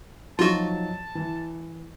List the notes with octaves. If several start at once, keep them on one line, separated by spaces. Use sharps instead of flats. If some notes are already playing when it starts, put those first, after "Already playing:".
F3 F#3 D#4 F4 F#4 A5
E3